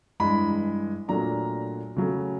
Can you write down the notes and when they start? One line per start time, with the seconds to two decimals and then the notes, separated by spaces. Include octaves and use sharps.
0.20 G2 E3 G#3 B5
1.08 A#2 F#3 A3 D4 A#5
1.96 C#3 F#3 A3